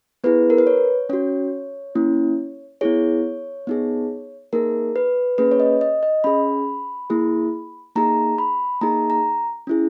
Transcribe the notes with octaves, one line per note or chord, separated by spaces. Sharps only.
B3 E4 G#4 B4
A#4
B4
C#5
C#4 F#4 C#5
A#3 C#4 E4
B3 E4 G#4 C#5
B3 D#4 G#4
A#3 D#4 G#4 A#4
B4
A#3 C#4 G#4 B4
C#5
D#5
D#5
D#5
C#4 G#4 B5
A#3 E4 G#4
A#3 D#4 G#4 A#5
B5
A#3 D#4 G#4 A#5
A#5
C#4 E4 G#4